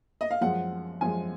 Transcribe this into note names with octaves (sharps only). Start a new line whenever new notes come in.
D#5
F5
F#2 F3 G#3 F#5
F#2 F3 G#3 G#5